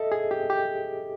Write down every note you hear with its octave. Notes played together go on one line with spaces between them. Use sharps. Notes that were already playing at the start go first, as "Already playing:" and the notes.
Already playing: A4 D#5 E5
G#4
G4
G4